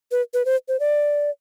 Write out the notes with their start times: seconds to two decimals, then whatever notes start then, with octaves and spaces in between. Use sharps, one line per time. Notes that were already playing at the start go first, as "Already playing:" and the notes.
0.11 B4
0.34 B4
0.45 C5
0.68 C5
0.80 D5